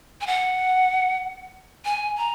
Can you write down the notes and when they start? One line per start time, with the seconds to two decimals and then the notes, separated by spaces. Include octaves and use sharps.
0.21 G#5
0.27 F#5
1.85 G#5
2.18 A#5